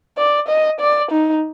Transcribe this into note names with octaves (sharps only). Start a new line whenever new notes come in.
D5
D#5
D5
D#4